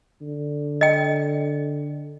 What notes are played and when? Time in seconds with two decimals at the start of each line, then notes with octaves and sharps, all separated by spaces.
0.22 D3
0.81 D#5 G5